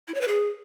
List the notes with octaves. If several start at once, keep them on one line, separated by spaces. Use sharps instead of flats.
E4
C#5
B4
G#4